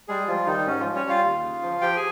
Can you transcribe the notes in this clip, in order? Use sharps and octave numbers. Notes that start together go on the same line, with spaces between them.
G3 G#3 G#4
F3 G3 F4
D#3 G3 D#4
G#2 C#4
F3 F4
G3
C#4 C#5
G3 F4 F5
D#2
C#3
F3
F3 G4 G5
G#4 G#5